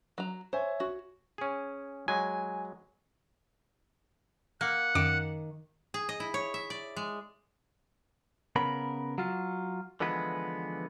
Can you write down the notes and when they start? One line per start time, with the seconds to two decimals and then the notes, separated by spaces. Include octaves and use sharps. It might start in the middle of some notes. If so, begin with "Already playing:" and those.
0.18 F#3 A#5
0.53 C5 C#5 E5 G#5
0.80 F#4
1.38 C#4 G#4
2.08 F#3 G#3 G#5
4.61 A#3 F#5 F6
4.95 F#2 D#3 D6 D7
5.94 G#4
6.09 D#5
6.20 E4
6.34 C#5
6.54 E5
6.70 D5
6.96 G#3
8.56 C#3 B3 A#4 B5
9.18 F#3 F4
10.00 D3 E3 F3 G#3 B3 B4